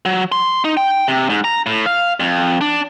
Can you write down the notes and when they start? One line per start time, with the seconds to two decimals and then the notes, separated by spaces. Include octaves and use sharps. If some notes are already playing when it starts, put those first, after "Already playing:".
0.05 F#3
0.32 C6
0.64 D#4
0.77 G5
1.08 C3
1.30 G#2
1.44 A#5
1.66 A2
1.86 F5
2.20 F2
2.61 D4